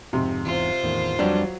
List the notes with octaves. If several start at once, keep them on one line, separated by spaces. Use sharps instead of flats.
F2 G#2 C3
E2 G#2 F4 C5
E2 A2 D#3
F2 F#3 G3 D4 G4